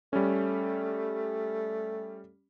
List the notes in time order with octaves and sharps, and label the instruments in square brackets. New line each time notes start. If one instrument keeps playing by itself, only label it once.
[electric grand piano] G3 C#4 [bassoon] A3